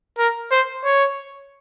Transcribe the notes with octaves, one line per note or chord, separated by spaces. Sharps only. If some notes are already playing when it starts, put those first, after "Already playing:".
A#4
C5
C#5